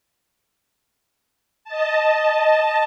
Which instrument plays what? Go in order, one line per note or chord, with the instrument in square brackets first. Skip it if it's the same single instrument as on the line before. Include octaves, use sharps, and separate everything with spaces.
[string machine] D#5 A5